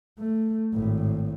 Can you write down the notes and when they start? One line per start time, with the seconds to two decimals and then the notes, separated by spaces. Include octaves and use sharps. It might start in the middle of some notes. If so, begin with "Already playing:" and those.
0.19 A3
0.73 G#1 A2